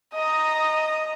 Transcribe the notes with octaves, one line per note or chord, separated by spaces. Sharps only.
D#5 A#5 D#6